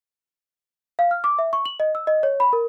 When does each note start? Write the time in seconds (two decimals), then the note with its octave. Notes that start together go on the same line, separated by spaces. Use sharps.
0.99 F5
1.11 F6
1.24 D6
1.39 E5
1.53 C#6
1.65 F#7
1.80 D#5
1.95 E6
2.07 D#5
2.23 C#5
2.40 B5
2.53 A#4